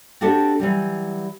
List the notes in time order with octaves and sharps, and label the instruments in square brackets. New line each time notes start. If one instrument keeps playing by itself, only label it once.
[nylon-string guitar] C4 D4 F#4 G4 A4
E3 F#3 G3